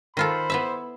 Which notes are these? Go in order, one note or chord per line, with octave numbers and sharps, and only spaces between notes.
D#3 F4 A4 C5 B5
B3 E4 E5